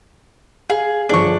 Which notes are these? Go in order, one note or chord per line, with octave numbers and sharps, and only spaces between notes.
G#4 F5
G1 F3 D4 G#4 C#6